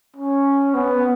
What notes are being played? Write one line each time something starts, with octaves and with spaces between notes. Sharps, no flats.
C#4
B3